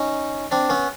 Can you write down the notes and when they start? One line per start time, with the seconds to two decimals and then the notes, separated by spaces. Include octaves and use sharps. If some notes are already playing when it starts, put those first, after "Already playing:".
Already playing: C#4 D#4
0.51 C4 D4
0.70 B3 C#4